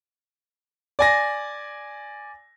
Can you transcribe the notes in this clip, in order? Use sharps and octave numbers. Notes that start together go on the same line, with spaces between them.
D5 G#5 A#6